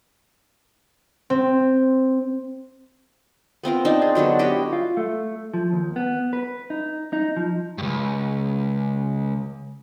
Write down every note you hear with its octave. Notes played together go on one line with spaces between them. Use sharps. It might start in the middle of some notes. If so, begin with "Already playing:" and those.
C4
B3 C4 F4 A#4
C4 D4 D#4
G#4
D3 F#3 B3 D4
E4 F#4 G4 D#5
F4
A3
F3
D#2
B3
B4
D#4
D#4
F3
C#2 G2